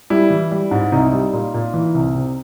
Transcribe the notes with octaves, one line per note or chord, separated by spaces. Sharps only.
G3 E4
E3
G3
G#2
C2 D#4
G3
A#2
A#2
E3
C2
C3